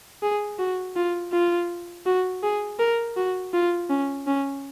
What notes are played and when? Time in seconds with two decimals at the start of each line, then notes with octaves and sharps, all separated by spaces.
0.23 G#4
0.59 F#4
0.96 F4
1.33 F4
2.06 F#4
2.43 G#4
2.79 A#4
3.17 F#4
3.54 F4
3.90 C#4
4.27 C#4